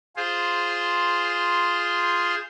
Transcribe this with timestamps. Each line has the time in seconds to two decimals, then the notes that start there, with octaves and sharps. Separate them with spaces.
0.16 F4 G#4 C5